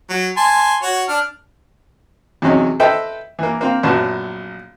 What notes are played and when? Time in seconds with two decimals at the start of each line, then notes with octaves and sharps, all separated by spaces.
0.10 F#3
0.37 G#5 A5 C6
0.83 F#4 C#5
1.08 D4 F6
2.42 E2 C3 F#3 C#4 D#4
2.80 A4 B4 C5 D#5 E5 G5
3.39 E3 A#3
3.61 A#3 C4 F5
3.83 A#1 F#2 F#3 B3 A5